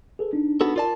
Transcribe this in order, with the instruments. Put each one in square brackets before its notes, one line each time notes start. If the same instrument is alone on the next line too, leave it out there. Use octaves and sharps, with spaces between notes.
[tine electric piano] G#4 A4 B4
D4 D#4
[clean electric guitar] B3 F#4 A4
[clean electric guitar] F4 D5 A5 [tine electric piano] A#4